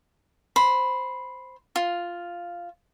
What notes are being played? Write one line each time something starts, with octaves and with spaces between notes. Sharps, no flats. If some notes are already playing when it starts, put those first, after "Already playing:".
C5 B5
F4